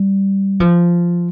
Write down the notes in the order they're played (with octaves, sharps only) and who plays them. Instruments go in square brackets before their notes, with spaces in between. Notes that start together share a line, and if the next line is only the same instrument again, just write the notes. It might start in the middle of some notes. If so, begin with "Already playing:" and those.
Already playing: [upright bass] G3
F3